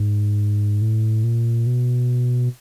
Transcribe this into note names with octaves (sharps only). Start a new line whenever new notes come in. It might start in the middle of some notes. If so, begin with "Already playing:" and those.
Already playing: G#2
A2
A#2
B2